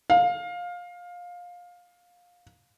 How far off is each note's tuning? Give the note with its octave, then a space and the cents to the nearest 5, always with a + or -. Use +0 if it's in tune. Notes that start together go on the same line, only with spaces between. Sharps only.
F5 +20